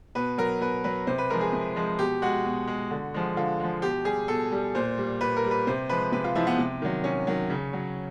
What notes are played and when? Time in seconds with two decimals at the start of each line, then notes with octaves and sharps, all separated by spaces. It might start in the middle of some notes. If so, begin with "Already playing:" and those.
0.15 B2 B4
0.38 F#3 A#4
0.61 B2 B4
0.84 F#3 B4
1.07 C3 C5
1.18 B4
1.30 F3 G#3 A#4
1.41 G#4
1.53 C3
1.76 F3 G#3
1.99 B2 G4
2.22 G#3 F#4
2.44 B2
2.67 G#3
2.91 D3
3.14 F3 G#3
3.37 D3 F4
3.60 F3 G#3
3.82 B2 G4
4.05 G3 G#4
4.28 B2 A4
4.52 G3
4.75 A#2 C5
4.98 G3
5.21 A#2 B4
5.37 A#4
5.44 G3
5.51 B4
5.67 C3 C5
5.89 F3 G#3 B4
6.12 C3 B4
6.24 F4
6.35 F3 G#3 E4
6.47 B3
6.58 C3
6.82 D#3 F#3
7.04 C3 C#4
7.27 D#3 F#3
7.50 C#3
7.73 F#3